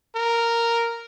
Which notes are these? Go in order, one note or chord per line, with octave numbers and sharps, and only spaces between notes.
A#4